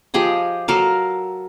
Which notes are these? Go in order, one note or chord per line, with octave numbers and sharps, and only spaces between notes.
F3 G4 G#4 D#5
F#3 A4 A#4 F5